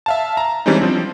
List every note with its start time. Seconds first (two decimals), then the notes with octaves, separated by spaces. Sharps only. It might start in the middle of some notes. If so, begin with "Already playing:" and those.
0.06 E5 F5 A5
0.37 A5 A#5
0.66 E3 G3 G#3 C4 C#4 D#4
0.80 F3 C4 D4